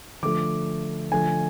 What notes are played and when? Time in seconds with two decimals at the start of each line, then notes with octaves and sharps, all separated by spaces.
0.23 D3 F3 A3 D6
1.12 D3 F3 A3 G#5